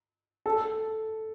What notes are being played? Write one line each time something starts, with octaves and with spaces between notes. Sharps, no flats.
A4